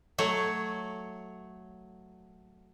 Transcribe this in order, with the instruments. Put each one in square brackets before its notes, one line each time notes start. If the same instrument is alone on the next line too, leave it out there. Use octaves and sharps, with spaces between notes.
[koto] F#3 A3 C#5